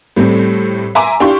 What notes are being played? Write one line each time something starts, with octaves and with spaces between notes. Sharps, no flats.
A2 G3 A3 C4
E5 G#5 A#5 C6 D6
D4 E4 G4 F5 C6 C#6